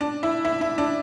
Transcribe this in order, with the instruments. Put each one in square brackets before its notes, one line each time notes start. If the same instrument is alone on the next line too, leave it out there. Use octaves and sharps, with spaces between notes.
[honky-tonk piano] D4
E4
E4
E4
D4